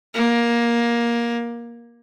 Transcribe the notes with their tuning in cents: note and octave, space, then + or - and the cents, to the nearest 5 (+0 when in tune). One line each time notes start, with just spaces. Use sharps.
A#3 +15